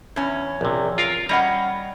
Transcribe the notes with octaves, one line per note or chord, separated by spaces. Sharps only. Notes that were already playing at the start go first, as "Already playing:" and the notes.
E2 C#4
A#1 C3
F4 A#4 F5
G3 C#4 D#5 F#5 A#5